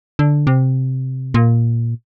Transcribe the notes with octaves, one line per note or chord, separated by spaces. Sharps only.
D3
C3
A#2